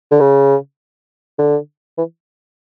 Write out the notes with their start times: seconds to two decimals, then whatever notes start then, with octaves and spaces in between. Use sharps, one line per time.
0.12 D3
0.21 C#3
1.39 D3
1.98 E3